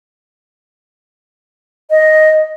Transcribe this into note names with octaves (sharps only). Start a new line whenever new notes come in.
D#5